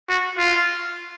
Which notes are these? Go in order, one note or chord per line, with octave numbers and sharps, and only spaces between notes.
F#4
F4